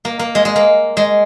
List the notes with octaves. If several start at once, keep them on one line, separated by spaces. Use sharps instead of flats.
A#3
A#3
G#3
G#3
A#3
G#3